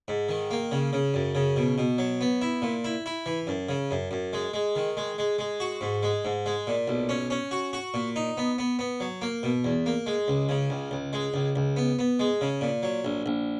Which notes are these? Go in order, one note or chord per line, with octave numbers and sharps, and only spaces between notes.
G#2
D#3
A#3
C#3
C#3
F#2
C#3
B2
B2
F#3
B3
E4
A#2
E4
E4
E3
F#2
C#3
F#2
F#2
G#3
G#3
D#3
G#3
G#3
G#3
F#4
G#2
G#3
G#2
G#3
A#2
B1
C#4
C#4
F#4
F#4
A#2
D#4
B3
B3
B3
F#3
A#3
B2
E2
A#3
G#3
C#2
C#3
C#2
C#2
G#3
C#2
C#2
B3
B3
G#3
C#3
A#2
F#3
A#1
A#1